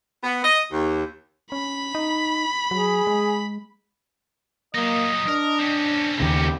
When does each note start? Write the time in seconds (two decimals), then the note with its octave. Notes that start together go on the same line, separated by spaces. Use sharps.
0.24 B3
0.44 D#5
0.72 D#2
1.52 C#4 B5
1.95 D#4
2.71 F#3 G#4
3.07 G#3
4.75 F#3 A#3 D#4 D#5
5.28 D4 A#4
5.60 C4 C#4
6.20 D#2 C#3 G4